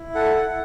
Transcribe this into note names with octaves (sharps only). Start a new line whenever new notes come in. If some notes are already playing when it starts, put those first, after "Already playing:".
Already playing: E4
A4 F#5
E4